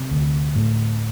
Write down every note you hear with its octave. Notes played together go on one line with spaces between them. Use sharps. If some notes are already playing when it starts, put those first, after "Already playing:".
Already playing: C3
D2
A2